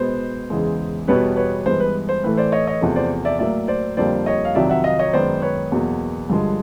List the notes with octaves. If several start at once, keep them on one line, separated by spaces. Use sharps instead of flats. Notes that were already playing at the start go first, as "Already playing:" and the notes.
Already playing: B2 G#3 B3 C5
E2 C#3 E3 G#3
E2 B2 G3 B3 B4 C#5
B4 C#5
G2 E3 G#3 B3 C5
B4
C5
A2 E3 A3 B4
C5 D5
C#5 D#5
C#5 D#5
E2 C3 F3 A3
C5 D5
D5 E5
A2 F#3 A#3 D5 E5
C5 D5
F2 D3 G3 A#3 C5 D5
C#5 D#5
F5
F2 C3 D#3 F#3 D5 E5
E5 F#5
D#5 F5
C#5 D#5
F#2 D#3 G#3 B3 C5 D5
B4 C#5
E2 B2 F#3 A#3
G2 D3 F3 G#3